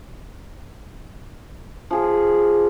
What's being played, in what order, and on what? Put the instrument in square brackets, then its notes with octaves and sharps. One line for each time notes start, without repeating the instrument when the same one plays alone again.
[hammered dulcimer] F3 G#4